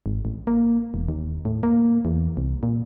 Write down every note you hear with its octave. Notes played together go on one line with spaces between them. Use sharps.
G#1
A1
A#3
E1
D#2
A2
A#3
E2
C2
A#2